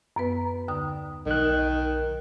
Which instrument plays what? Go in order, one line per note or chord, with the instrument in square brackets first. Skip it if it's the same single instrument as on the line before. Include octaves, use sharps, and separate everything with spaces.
[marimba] F#2 B3 B4
D#2 D3 D#6
[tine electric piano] B1 F#6 [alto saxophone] D#3